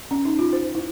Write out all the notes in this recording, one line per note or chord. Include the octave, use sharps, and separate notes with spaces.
C#4
D#4
F4
C5
E4